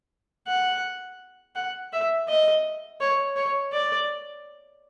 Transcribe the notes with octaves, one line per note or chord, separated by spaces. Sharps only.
F#5
F#5
E5
D#5
C#5
C#5
D5